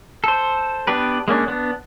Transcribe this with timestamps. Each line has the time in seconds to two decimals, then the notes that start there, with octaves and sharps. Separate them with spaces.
0.24 A4 C5
0.87 B3 D4 G4 B4
1.28 G#3 A#3 C#4 D4
1.48 B3 D4